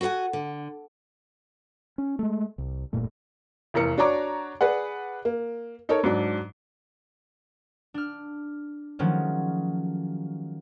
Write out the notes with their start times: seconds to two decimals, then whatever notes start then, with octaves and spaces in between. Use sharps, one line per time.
0.01 F#4 A4 B4 F#5 G#5
0.33 D3
1.98 C#4
2.19 G#3 A3
2.58 C2
2.93 F1 G2 A#2 A3
3.74 F1 E2 A#4 C#7
3.98 D4 F#4 C#5 D5 A#5 D6
4.61 G#4 B4 D5 F#5
5.25 A#3
5.89 D#4 A4 A#4 C#5
6.04 G#2 F#3 D4
7.94 D4 F6
8.99 D#3 F3 F#3 G#3 A3 C#4